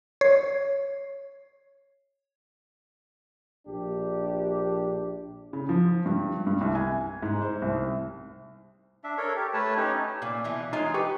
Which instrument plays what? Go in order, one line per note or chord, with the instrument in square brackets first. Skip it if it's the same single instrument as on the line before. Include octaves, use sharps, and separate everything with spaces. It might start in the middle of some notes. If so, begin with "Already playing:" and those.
[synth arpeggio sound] C#5 C7
[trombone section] A#1 D4 G4
[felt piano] C#3
F3
G2
G2
C2
G#5
G#2
C5
C2
[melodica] D4 E5
A4 A#4 C#5
G4
A3 B4 C#5 A5
C#4 D#4 G4 C#5
[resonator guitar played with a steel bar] A#2
B2 E3 E5
[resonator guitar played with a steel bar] G#3 F4 C#5 [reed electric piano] D#4
[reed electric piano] G4 C#6 [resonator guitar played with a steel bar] B4